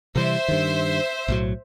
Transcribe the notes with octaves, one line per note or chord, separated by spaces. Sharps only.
C3 E3 G3 C5 E5
G2 D#3
B1 A2 F#3